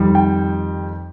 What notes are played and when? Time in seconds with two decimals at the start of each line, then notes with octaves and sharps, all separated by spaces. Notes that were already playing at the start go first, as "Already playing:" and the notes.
Already playing: F2 D#3 G3
0.15 G5